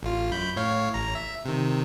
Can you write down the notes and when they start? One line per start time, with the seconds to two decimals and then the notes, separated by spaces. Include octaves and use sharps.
0.03 A1 F4
0.32 F#2 B5 G6
0.56 A2 C#5 F5
0.94 A1 A#5
1.15 E5
1.45 C3 D#3